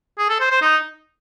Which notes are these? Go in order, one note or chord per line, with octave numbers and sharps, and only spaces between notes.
G#4
A4
C5
C5
D#4